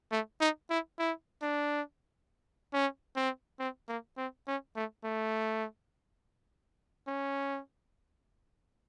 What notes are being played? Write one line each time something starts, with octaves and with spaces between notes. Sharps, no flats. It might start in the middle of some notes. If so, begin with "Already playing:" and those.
A3
D#4
E4
E4
D4
C#4
C4
C4
A#3
C4
C#4
A3
A3
C#4